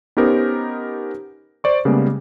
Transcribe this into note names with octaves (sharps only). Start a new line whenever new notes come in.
B3 C#4 D#4 G4 A#4 C5
C5 D5 C#6
C#3 G3 G#3 A#3 B3